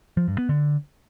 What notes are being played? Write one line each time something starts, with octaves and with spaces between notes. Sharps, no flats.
F3
G2
B3
D3